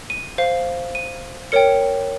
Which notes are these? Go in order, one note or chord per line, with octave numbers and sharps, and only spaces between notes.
D#7
C5 F5
D#7
A#4 C#5 G5 C#7